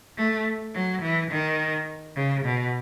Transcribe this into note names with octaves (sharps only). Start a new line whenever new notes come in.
A3
F#3
E3
D#3
C#3
B2